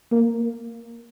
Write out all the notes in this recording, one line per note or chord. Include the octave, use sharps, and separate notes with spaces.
A#3